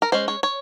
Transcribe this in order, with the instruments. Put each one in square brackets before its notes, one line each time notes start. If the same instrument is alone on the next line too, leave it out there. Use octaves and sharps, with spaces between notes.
[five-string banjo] A#4
G#3 C#4 C5
C#5
C#5